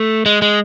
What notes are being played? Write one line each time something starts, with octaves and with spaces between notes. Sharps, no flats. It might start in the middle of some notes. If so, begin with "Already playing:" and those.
Already playing: A3
G#3
G#3